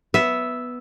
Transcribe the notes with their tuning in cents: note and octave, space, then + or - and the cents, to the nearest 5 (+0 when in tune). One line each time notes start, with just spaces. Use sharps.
B3 +0 E5 +0